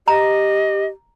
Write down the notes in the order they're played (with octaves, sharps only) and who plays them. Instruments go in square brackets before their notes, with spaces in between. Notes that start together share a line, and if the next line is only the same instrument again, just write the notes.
[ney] G4 [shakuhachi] D#5 [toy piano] A#5